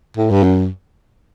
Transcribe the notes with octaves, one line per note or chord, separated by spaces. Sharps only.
A2
G2
F#2